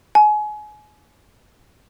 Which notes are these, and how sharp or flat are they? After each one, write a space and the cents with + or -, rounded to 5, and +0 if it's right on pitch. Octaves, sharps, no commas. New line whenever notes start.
G#5 +30